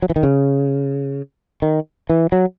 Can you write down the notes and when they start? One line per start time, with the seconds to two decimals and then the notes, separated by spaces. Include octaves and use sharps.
0.02 F#3
0.10 E3
0.16 D#3
0.23 C#3
1.62 D#3
2.10 E3
2.32 F#3